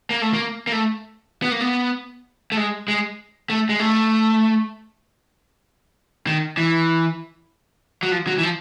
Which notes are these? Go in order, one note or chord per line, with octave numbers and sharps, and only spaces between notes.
A#3
A3
A#3
A#3
A3
B3
A#3
B3
A3
G#3
G#3
A3
G#3
A3
D#3
E3
F#3
F3
F#3
E3
F3